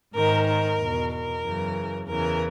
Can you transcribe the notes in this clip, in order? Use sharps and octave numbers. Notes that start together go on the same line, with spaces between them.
G#2 D#3 A#4
A#4
E2 B2
A#4
F#2 C#3 E3
E2 C#3 E3 A#4